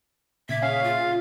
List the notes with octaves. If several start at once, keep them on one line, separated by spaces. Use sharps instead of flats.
A#2 C#3 E5 D6 G#6 B6
C#4 G#4 F5
F4